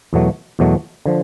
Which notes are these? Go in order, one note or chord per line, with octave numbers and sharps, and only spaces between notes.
E2 B2 F#3 A3
E2 B2 F#3 A3
D3 F3